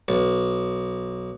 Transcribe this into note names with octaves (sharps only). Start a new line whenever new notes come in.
B1